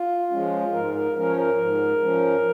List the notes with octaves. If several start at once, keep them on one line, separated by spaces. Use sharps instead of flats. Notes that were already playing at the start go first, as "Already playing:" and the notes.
Already playing: F4
F3 G#3 C#4
G#2 A#4
A#4
F3 C#4 A#4
C#5
A#4
G#2
F3 C#4